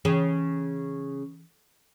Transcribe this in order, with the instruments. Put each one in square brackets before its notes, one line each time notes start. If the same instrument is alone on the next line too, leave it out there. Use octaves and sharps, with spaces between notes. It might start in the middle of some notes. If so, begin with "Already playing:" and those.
[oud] C#3 [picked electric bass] E3